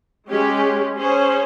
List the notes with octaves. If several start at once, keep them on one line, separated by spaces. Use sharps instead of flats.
G#3 C#4 G4
C#4 G#4 C5